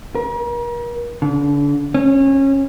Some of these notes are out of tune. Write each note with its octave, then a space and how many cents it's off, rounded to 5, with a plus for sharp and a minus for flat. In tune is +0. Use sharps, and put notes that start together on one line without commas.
A#4 +40
D3 -35
C#4 -25